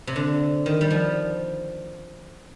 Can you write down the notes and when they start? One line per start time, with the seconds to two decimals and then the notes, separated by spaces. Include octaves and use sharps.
0.07 C3
0.16 D3
0.66 D#3
0.81 G3
0.90 F3